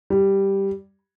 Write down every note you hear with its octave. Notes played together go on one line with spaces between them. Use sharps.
G3